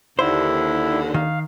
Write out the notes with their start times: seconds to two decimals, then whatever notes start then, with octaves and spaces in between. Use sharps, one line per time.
0.19 D#2 D3 E4 C5
1.14 D#3 F5